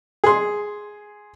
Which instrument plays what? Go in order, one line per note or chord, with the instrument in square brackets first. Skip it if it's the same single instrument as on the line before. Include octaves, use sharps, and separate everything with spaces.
[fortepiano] G#4 C6